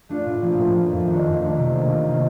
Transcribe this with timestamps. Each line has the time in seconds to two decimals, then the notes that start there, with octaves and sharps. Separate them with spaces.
0.09 A3 D4 F4
0.26 A2
0.42 F3 A#3 F4
0.58 A2
0.75 F3 A#3 F4
0.90 F2
1.07 D#3 A3 D4
1.24 F2
1.39 D#3 A3 D4
1.57 C3
1.72 D#3 A#3 F4
1.89 C3
2.06 D#3 A#3 F4